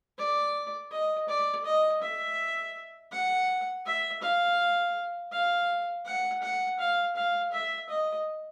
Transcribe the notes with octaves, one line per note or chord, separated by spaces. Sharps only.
D5
D#5
D5
D#5
E5
F#5
E5
F5
F5
F#5
F#5
F5
F5
E5
D#5